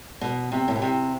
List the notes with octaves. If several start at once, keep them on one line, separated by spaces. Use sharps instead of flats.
B2
C3
A2
B2
C3